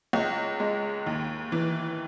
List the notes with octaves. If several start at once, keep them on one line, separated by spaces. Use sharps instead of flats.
C#2
G#3
D#2
E3